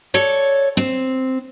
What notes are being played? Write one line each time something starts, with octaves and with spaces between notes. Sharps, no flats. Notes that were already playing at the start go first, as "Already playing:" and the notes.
A4 C#5 D5
C4